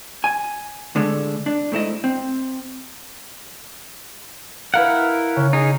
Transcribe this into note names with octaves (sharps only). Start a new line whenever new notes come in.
G#5
A2 D3 G#3 A3
D4
G#2 A3 E4 D#5
C4
E4 A#4 B4 F5 F#5
C#3
D#4 G#4